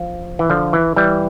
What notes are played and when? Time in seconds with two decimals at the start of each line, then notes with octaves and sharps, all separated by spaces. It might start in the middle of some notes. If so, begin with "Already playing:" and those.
Already playing: F3
0.39 E3
0.50 D3 F3
0.73 E3
0.96 E3 G3